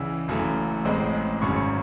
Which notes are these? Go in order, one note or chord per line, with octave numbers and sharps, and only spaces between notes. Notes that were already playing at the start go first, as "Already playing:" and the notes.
Already playing: C#2 C#3 E3 E6
F#1 F#2 E3 A3
A1 A2 G#3 C4
G#1 F#2 C#3 C#6
C#6